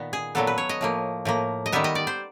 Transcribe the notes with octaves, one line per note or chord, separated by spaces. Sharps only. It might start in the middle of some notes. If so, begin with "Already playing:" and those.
Already playing: A#2 D#3 B3
G#4
A#2 F#3 B3 A4
B4
C#5
D#5
A2 F3 A#3
A2 F3 A#3
D#5
D#3 G3 B3 E5
D#5
D5
C5